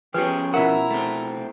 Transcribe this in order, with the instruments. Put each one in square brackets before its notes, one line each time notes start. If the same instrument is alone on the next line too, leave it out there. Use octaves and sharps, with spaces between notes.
[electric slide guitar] F3 C#4 [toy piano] G4 B4 [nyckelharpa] G#4 G5
[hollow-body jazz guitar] B2 E5 F#5 [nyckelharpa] E4 A#5 [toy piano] A#4
[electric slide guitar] A3 C4